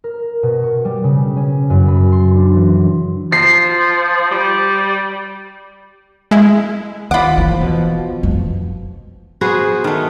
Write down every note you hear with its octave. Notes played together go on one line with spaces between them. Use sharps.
A#4
B2
C#6
G3
C#3
C#4
F#2
B5
C6
D4
E3
F3 C7
G3
G#3 E4
D#2 F4 F#5 B5 D6
A1 D#2 E3 F3
B2 F3
F2
B3 F#4 G#4 C5
D#3 A3